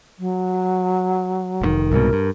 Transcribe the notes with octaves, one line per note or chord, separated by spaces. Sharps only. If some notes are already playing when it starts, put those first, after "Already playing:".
F#3
F1 A#2 D#3
C2 G#2 B2 A#4
G2